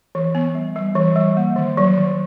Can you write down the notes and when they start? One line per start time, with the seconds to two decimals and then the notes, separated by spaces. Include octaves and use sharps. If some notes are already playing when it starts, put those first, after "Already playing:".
0.15 E3
0.35 B3
0.55 G3
0.76 G3
0.95 E3
1.15 G3
1.37 A#3
1.56 D#3
1.77 F#3
1.97 D#3